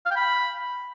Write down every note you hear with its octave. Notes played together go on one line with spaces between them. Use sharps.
F5
G5
B5